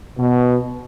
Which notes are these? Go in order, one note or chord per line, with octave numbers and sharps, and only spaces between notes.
B2